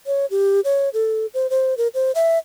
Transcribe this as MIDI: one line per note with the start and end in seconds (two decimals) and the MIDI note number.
0.07 0.26 73
0.31 0.61 67
0.65 0.89 73
0.94 1.26 69
1.34 1.49 72
1.50 1.77 72
1.78 1.88 70
1.94 2.12 72
2.15 2.38 76